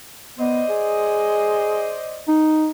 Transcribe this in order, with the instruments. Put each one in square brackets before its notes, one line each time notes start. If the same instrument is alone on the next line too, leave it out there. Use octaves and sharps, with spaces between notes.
[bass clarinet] B3 [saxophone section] C5 D5 D#5
[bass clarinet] G#4
D#4